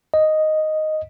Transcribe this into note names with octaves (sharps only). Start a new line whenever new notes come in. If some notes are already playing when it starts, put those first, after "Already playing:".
D#5